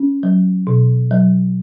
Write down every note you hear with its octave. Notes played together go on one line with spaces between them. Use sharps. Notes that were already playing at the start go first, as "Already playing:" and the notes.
Already playing: C#4
F#3
B2
F#3